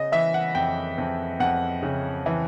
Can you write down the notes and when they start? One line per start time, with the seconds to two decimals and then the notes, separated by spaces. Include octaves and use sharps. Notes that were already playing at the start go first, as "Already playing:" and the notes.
Already playing: C#3 D#5
0.12 E3 E5
0.34 F#5
0.55 F2 G5
0.98 F2
1.40 F2 F#5
1.83 C#3
2.26 E3